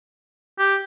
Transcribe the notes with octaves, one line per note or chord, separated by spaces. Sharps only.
G4